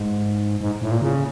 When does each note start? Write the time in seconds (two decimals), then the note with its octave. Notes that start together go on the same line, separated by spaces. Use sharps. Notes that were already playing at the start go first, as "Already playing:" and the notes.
Already playing: G#2
0.61 G#2
0.82 A2
0.91 A#2
1.02 C#3